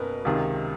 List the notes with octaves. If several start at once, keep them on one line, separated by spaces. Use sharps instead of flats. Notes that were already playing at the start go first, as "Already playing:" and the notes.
Already playing: F#1 B2 A#4 B4
C#2 C3 D#3